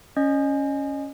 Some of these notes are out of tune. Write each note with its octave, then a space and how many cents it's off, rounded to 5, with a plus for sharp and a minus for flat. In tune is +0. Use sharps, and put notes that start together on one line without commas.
C#4 +0 D#5 -25